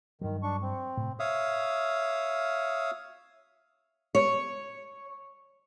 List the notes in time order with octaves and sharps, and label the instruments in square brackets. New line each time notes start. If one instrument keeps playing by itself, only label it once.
[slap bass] G2 F#3 [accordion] D#3
[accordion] D4 C#6
C4
[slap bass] A2 C3
[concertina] C#5 E5 F5 D#6
[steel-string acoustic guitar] C#5